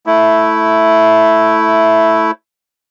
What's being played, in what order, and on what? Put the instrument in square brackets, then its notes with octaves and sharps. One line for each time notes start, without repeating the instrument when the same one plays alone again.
[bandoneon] A3 E4